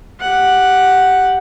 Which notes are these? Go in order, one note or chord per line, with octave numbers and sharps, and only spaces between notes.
G4 F#5